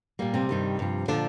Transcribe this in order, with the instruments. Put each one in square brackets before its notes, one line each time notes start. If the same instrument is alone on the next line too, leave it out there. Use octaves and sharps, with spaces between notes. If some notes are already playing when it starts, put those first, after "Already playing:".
[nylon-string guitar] A#2 G3 A#3
C3 C4
G2 D#3 G3
G2 F3
A#2 D3 F3 D4